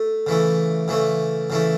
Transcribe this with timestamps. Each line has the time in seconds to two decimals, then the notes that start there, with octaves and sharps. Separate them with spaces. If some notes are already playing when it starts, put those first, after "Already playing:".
Already playing: A3
0.27 C#3 E3 A3
0.88 C#3 E3 A3
1.50 C#3 E3 A3